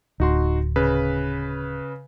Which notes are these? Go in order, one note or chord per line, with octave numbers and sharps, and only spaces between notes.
D1 D#4 F#4 C6
C#3 B4